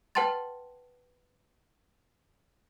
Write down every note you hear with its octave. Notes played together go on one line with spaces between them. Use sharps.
B4 F#5 G5 A5 C6 A6